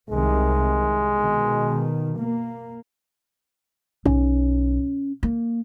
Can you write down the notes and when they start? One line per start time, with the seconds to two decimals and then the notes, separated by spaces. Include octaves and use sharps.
0.10 C2 C3 D#3 G#3
1.16 B2 D#3
2.17 A#3
4.05 B1 C#4
5.23 A#3